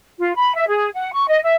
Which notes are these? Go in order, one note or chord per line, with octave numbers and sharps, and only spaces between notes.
F4
B5
E5
G#4
F#5
C#6
D#5
E5